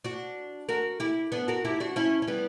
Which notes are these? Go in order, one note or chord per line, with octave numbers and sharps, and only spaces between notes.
D4 F#4
F#4 A#4
E4 G4
B3 D4
F#4 A#4
E4 G4
D4 F#4
C#4 E4
C#4
G3 B3